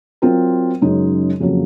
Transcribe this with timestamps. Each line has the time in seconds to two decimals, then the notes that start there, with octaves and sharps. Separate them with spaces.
0.22 F#3 C4 F4 A#4
0.81 F#2 C#3 G#3 D#4
1.40 F2 C#3 F#3 A#3